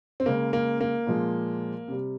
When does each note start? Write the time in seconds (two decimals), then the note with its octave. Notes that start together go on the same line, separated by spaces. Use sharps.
0.20 C4
0.26 C#3 G#3 A#3
0.53 A#3
0.81 A#3
1.07 A#2 F3 G#3
1.88 C3 G3